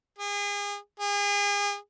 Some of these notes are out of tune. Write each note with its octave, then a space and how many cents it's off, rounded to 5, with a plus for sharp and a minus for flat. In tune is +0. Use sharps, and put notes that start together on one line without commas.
G#4 -35
G#4 -35